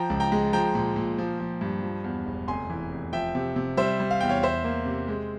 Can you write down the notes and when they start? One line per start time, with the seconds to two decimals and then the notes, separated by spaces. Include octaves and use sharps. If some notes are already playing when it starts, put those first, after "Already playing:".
Already playing: F3 G5 A#5
0.10 C#2
0.20 G5 A#5
0.32 G#3
0.53 F3 G5 A#5
0.75 A#2
0.96 A#2
1.19 F3
1.40 F3
1.61 G2
1.82 F3
2.04 E2
2.26 E1
2.48 F1 G#5 C6
2.70 E3
2.92 F1
3.13 F3 E5 G5
3.35 C3
3.56 C3
3.77 G3 C5 E5
4.00 G3
4.11 F5
4.21 E2 G5
4.29 C#5 F5
4.43 E2 C5 E5
4.64 A#3
4.86 C3
5.08 G#3